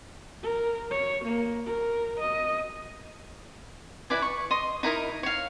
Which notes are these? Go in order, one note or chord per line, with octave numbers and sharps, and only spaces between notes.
A#4
C#5
A#3
A#4
D#5
E4 B4 D5 G#5
C#6
D#5 C6 D#6
D#4 E4 A#4 D#6
C#5 F5